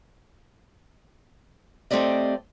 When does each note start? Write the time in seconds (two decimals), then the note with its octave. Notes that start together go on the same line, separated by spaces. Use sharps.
1.91 A3 C4 G4 D5 D#5